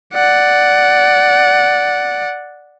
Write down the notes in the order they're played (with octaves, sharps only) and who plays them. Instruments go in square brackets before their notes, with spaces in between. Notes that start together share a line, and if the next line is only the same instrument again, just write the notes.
[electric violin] D5 F#5